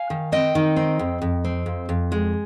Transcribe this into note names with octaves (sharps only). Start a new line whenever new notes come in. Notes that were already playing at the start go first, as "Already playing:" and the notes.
Already playing: F5 G#5
D#3
C4 D#5 G5
D#3
C4
F2
F2
C4
F2
F2
G#3